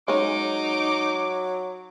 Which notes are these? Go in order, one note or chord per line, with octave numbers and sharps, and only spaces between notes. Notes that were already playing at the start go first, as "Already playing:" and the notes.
F#3 G#3 C#4 D#4 D6